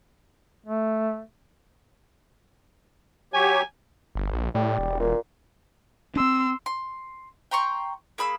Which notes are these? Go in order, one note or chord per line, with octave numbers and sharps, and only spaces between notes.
A3
F#3 G4 C#5 G#5
G1
A#1
A2 G3
E1
A#2
C4 D4 C6 E6
C6
G5 A#5 C6 C#6
A#3 G#4 B5 E6